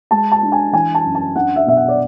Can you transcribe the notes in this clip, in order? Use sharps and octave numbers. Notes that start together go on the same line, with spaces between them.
G#3 A5
A5
D4
G#5
E3 G#5
A5
F#2
A5
D4 F#5
E5
B2 E5
F#5
D5